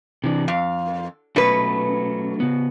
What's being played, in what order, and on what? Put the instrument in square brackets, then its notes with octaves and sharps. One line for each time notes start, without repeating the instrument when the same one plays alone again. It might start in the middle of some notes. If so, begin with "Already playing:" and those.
[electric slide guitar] C3 E3 D4
[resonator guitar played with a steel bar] F2 [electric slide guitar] F5
[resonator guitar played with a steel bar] B2 B4 [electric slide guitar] F#3 A3 C#4
[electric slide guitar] C#3 B3